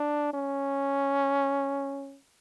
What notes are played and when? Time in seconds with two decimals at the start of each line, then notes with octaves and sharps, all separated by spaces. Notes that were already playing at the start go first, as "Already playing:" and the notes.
Already playing: D4
0.34 C#4